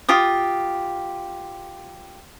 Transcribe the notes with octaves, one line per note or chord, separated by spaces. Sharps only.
F4 G4 D#6